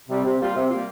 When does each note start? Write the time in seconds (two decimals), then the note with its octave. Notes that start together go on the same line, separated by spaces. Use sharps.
0.09 C3 G3
0.24 C3
0.39 G3 A#3 F4
0.54 C3
0.69 G3 A#3 F4